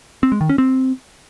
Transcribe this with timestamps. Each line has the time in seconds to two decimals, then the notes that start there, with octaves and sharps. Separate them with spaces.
0.23 C4
0.32 G#3
0.41 D#3
0.49 C#4
0.58 C4